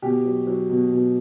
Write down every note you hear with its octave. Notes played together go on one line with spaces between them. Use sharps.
B2 G4
F#3
F#3
B2
B2